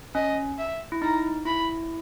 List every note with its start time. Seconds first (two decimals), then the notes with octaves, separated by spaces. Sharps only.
0.15 C#4 D#5
0.59 E5
0.92 E4
1.02 D#4 A#5
1.45 E4 B5